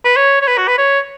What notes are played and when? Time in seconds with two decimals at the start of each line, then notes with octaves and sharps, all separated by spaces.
0.05 B4
0.16 C#5
0.42 C#5
0.47 B4
0.58 F#4
0.68 B4
0.78 C#5